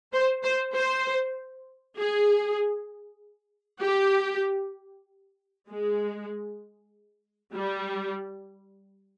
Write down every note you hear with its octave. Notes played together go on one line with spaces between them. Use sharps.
C5
C5
C5
G#4
G4
G#3
G3